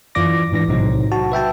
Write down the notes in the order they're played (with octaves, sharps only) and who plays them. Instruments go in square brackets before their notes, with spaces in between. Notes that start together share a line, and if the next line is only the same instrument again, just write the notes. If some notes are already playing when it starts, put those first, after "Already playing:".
[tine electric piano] F#2 E3 F4 D5 D6 A#6
G#2 E3 D4 A#6
B1 A2 C3 F#3 D#4 C5
F#4 A5
B4 E5 G5 A5